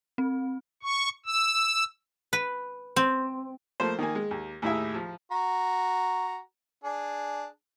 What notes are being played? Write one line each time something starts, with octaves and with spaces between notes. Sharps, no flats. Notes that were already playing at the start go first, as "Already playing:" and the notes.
C4
C#6
E6
B4
C4
F3 A3 A#3 C5
D#3 A#3 G#5
G#3
D#2
D#2 A2 E4 G#4 E5
F3
F#4 A#5
D4 G#4